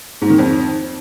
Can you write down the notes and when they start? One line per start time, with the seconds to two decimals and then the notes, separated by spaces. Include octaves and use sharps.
0.21 G#2
0.30 D#3
0.38 F2